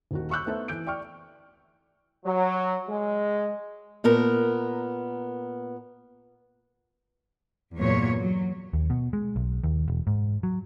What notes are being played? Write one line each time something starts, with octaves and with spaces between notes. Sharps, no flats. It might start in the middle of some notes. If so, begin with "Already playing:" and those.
D#1 D#3 F#4
B5 C#6 E6 F#6 G6
A3 B3 D#4 A4 C5 E5
E3 G6 D7
D5 G5 C#6 F6
F#3
G#3
A#2 B3 A#4 A#5
E2 G2 A#2 F#3 C#5
F#3
D#2
B2
G#3
B1
D#2
E1
G#2
F#3